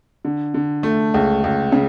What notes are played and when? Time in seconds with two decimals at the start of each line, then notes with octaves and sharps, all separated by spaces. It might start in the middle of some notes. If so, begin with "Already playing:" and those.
0.25 D3
0.54 D3
0.83 A3
1.14 C#2
1.44 C#2
1.72 C#3